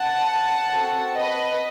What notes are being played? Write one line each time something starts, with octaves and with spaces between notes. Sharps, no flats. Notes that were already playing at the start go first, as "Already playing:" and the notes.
Already playing: F#5 A5
C4 F#4 A4
B4 D#5